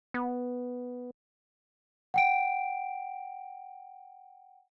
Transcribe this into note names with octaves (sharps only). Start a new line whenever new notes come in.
B3
F#5 G5 D7